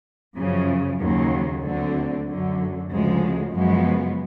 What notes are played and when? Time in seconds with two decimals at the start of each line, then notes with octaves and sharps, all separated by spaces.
0.36 F#2 C#3 F3
1.00 D#2 C#3 F#3
1.63 D2 D3 F#3 A3 C4
2.26 F#2 D3 F#3
2.90 D2 C#3 F3 G#3
3.52 F#2 C#3 F3 G#3 B3